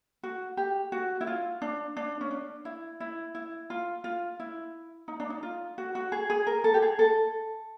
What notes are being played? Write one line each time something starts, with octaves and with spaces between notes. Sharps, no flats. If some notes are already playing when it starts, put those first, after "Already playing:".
F#4
G4
F#4
E4
F4
D4
D4
C#4
D4
E4
E4
E4
F4
F4
E4
D#4
D4
D#4
F4
F#4
F#4
G#4
G#4
A#4
A4
G4
G#4
A4